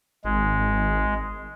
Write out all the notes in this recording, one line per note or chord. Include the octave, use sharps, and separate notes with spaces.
G#1 G#3